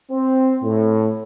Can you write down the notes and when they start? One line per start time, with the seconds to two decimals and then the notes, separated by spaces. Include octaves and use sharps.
0.11 C4
0.63 A2